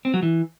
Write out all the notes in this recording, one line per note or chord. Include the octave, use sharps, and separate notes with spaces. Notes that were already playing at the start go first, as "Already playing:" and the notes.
C4
F#3
E3